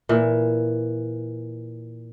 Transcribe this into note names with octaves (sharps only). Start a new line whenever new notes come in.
A#2 E3